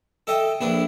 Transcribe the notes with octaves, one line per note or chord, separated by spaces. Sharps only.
A4 D#5 E5 G5
A#1 D4 E4 B4